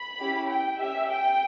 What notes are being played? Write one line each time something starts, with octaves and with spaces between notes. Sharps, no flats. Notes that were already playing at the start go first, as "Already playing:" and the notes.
Already playing: B5
C#4 E4 G4
G5
C#4 G4 E5
G5